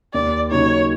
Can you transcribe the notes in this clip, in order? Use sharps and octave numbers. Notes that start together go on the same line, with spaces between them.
D#2 D5
C#3 F#3 A#3 D#4 C#5